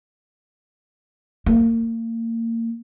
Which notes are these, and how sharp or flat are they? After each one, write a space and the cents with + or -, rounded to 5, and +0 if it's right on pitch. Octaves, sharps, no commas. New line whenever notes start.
A#3 -30